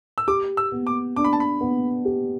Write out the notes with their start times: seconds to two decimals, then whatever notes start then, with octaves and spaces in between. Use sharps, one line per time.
0.18 E6
0.28 G4 D6
0.57 E6
0.72 B3
0.87 D6
1.16 D4 D6
1.24 B5
1.33 A5
1.40 B5
1.61 B3
2.05 G4